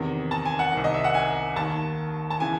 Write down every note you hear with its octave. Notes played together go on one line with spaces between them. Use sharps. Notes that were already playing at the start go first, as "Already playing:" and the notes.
Already playing: E2 C3 D#3
A5
G#5
F#5
C2 C3 D#3
D#5
E5
F#5
G#5
D#2 D#3 A5
A5
C#3 E3 G#5